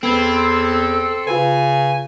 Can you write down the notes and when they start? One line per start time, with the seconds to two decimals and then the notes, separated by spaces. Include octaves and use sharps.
0.03 E2 B3 C4 A4 B5 G#6
1.27 C#3 F4 B4 G#5